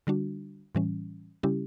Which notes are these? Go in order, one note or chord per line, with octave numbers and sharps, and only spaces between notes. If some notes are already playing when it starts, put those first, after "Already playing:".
D3 G3 D4 F#4
A2 E3 G3 C#4
C#3 G3 C#4 E4 G4